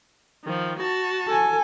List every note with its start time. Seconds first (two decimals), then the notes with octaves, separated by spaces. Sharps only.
0.44 D#3 F3
0.78 F#4 A5
1.27 A4 G#5